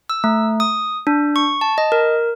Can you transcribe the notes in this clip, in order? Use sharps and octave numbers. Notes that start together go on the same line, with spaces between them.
E6
A3
D#6
D4
C#6
A5
D#5
A#4